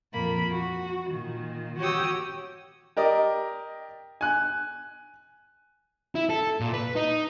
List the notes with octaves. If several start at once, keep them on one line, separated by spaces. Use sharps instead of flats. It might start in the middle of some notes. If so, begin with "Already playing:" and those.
F2 A#2 A#3 B5
F#4
A#2 D#3
F#4 G4 C#5 G5 D#6 E6
G4 A#4 D5 D#5
G#5 F#6
E4
A4
A#2
B4
D#4